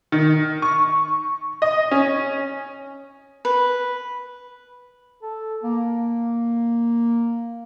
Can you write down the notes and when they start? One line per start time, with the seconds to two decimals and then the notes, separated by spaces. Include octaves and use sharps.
0.12 D#3
0.62 C#6
1.62 D#5
1.91 C#4
3.45 B4
5.22 A4
5.63 A#3